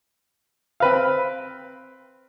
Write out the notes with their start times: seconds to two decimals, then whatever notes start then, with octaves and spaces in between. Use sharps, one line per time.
0.80 C4 B4 F5